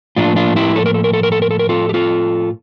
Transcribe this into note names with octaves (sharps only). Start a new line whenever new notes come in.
A2 F3 A#3 D4 F4
D4 F4
E4 G4
A4
A#4
A4
A#4
A4
A#4
A4
A#4
A4
A#4
F4 A4
G4
F4 A4